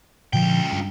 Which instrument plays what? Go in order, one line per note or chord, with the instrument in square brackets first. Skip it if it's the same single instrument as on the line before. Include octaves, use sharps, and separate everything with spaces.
[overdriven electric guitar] C#2 G5 [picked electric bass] A#2 D3 F3
[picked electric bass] G2